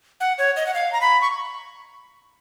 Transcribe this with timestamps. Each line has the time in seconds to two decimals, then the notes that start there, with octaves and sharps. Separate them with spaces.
0.20 F#5
0.38 C#5
0.57 D#5
0.66 F#5
0.74 F5
0.92 A#5
1.01 B5
1.22 C#6